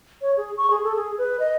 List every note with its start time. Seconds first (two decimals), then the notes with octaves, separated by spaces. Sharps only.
0.22 C#5
0.37 G#4
0.57 C#6
0.70 G#4
0.84 A4
0.96 G#4
1.18 B4
1.40 D#5